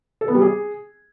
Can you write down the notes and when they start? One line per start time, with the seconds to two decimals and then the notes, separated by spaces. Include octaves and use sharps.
0.21 A4
0.28 B3
0.35 G3
0.42 G#4